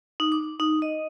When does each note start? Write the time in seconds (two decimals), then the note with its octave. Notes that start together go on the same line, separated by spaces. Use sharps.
0.20 D#4
0.32 D6
0.60 D#4
0.82 D#5